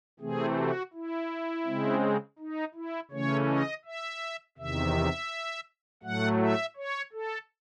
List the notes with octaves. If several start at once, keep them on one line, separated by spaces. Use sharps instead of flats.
C3 E3 A3 C4 G#4
F#4
E4
C#3 G#3 C4
D#4
E4
C#3 E3 A3 C#4 C#5
D#5
E5
E2 C3 D#3 E5
A2 F#3 A3 F#5
E5
C#5
A4